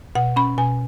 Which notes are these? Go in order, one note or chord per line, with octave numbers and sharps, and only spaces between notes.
B2 F#5
C#4 B5
B2 G#5